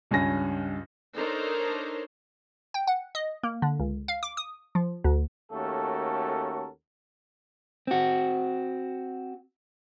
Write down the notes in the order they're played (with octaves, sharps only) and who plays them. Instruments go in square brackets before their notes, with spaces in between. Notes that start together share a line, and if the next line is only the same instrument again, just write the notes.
[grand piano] C#2 G2 C#4 G#5 A#6
[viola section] D4 D#4 A4 A#4 C5 C#5
[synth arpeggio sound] G5
F#5
D#5
A#3
D3
C#2
F5
D6
D#6
F3
D2
[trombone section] D#2 A3 C#4 F#4 A4 A#4
[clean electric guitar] C4 F#4